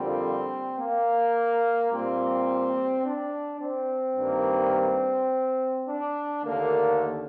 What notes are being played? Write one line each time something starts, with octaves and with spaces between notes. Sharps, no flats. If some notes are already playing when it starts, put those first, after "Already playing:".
Already playing: F2 D3 G3 A#3 C4
A#3
A#2 G3 A#3 C4
D4
C4
G2 D#3 G3 A#3
D4
D#2 D3 A3 A#3